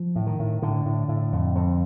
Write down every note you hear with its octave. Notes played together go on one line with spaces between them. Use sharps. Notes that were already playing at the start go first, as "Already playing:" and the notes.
Already playing: F3
A2
D#3
A2
A2 D3
A2
A2
F2
F2